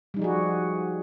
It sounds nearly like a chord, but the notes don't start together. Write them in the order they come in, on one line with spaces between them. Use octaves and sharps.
G3 D#4 F3 G#4 F#4